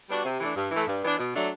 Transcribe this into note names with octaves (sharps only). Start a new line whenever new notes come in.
G3 B3 D4 F#4
C3
E3 A3 D4
G2
E3 A3
G2
E3 B3 D4
B2
F#3 A3 D4